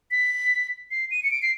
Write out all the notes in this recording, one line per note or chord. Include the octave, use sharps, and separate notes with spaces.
B6
C7
D#7
C#7
D7
C7